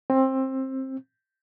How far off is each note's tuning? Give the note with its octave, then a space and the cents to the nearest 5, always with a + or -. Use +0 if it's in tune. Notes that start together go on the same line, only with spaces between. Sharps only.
C4 +20